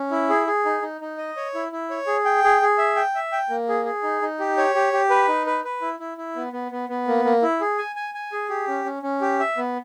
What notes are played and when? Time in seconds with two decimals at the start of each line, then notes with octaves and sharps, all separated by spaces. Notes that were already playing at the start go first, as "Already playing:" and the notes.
Already playing: C#4
0.11 E4
0.29 G#4
0.47 G#4
0.65 D#4
0.82 D#4
1.01 D#4
1.18 D#5
1.37 C#5
1.55 E4
1.72 E4
1.90 C#5
2.07 G#4
2.25 G5
2.44 G#4
2.62 G#4
2.78 E5
2.96 G5
3.15 E5
3.32 G5
3.50 A#3
3.69 G#4
3.85 G#4
4.03 D#4
4.22 D#4
4.40 G4
4.58 C#5
4.75 G4
4.93 G4
5.10 B4
5.28 D#4
5.47 B4
5.64 B4
5.81 E4
5.99 E4
6.18 E4
6.36 B3
6.53 B3
6.72 B3
6.89 B3
7.08 A#3
7.25 A#3
7.42 E4
7.61 G#4
7.78 G#5
7.96 G#5
8.15 G#5
8.32 G#4
8.50 G4
8.68 C#4
8.85 C#4
9.03 C#4
9.21 G4
9.39 E5
9.57 B3